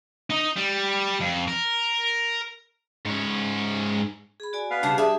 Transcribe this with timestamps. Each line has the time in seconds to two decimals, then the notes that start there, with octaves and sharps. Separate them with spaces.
0.30 D#4 D#5
0.56 G3
1.20 F2
1.48 A#4
3.05 G#2 C#4
4.40 G#4 B5
4.53 F#4 D5 G#5
4.71 B3 B4 F5
4.83 C#3 G3 D4 G4 A5
4.98 D4 G#4 E5 A5